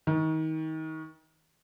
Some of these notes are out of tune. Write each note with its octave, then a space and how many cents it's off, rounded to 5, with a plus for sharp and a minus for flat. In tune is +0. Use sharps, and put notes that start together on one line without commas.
D#3 +30